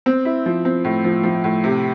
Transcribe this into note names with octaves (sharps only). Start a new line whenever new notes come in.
C4
E4
F3
C4
A2
F3
F3
A2
C3